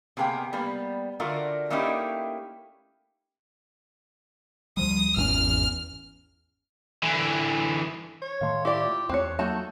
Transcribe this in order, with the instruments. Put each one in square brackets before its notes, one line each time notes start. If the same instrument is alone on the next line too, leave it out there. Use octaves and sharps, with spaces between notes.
[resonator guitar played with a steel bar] C3 A#3 B3 G#4 F5 G5
G3 A#3 B3 B4
D3 A3 D4 F4 F#4 A#4
A3 A#3 C#4 D#4 E4 G4
[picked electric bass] D2 F3 G3 [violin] D#6
[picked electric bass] G#1 D#3 C#4 [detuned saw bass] E2 [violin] F6
[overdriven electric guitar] D3 E3
[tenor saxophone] C#5
[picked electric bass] A2 D#3 A3 [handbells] F5 C6 C#6
[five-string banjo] E4 D5 [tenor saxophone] G4
[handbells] F4
[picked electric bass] E2 A3 [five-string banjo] C4 C#5 [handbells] C#6 F#6 C#7
[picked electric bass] F#3 A#3 [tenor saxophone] A3 [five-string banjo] D#4 F#4 A5 [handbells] C#6 G6